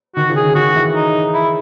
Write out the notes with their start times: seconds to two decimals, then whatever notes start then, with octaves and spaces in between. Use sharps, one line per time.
0.16 D#3 F#4
0.30 C#3
0.36 G#4
0.43 D#3
0.55 D#3 F#4
0.76 E3
0.95 D#4
1.34 E4